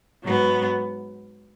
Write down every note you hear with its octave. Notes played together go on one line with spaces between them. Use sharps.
G#2 F#3 B3